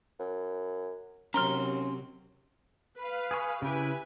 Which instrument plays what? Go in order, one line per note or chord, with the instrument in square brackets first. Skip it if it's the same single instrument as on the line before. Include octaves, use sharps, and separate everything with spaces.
[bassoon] F#2
[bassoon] D#2 [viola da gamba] C3 F#3 [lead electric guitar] C#4 C6 [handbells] A#5 F6
[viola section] B4 F5
[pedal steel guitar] G#4 G#5 C#6
[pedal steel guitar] C#3 E4 [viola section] G4 B4 G#5